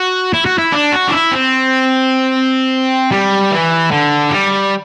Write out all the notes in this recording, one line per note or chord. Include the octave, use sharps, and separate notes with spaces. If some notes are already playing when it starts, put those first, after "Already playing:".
Already playing: F#4
E4
F#4
E4
D4
F#4
D4
E4
C4
G3
E3
D3
G3